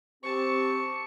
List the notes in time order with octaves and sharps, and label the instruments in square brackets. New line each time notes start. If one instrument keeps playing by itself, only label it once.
[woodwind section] C4 G4 [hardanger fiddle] A5 C#6